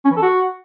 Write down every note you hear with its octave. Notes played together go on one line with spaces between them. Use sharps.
C#4
E3
A4
F#4